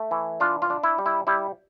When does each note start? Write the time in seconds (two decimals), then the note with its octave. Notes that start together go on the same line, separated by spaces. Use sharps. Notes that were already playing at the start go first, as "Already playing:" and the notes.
Already playing: A3
0.11 E3
0.40 D4 F4
0.62 F4
0.70 D4
0.83 E4
0.98 G3
1.06 E4
1.27 G3 E4